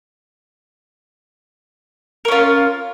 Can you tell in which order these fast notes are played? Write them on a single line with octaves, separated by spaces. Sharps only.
A#4 C#4 F4